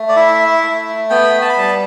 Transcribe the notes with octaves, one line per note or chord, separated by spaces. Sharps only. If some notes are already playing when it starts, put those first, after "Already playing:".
Already playing: A3
D5
E4 E5
A3
B3 G5
A5
B5
G3 A5